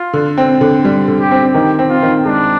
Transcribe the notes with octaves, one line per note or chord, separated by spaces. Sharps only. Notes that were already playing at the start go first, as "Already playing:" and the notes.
Already playing: F4
D3
C4
D3
G3
D3
G4
C4
D#3 G4
C4
F4
D#3
G#3 D4